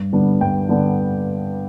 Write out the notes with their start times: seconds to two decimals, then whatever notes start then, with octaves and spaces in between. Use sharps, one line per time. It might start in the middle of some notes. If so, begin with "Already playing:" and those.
Already playing: G2
0.13 D3 G3 B3 D4
0.41 G2 G5
0.69 D3 G3 B3 D4